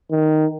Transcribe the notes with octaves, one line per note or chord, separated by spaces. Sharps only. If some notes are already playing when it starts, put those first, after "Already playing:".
D#3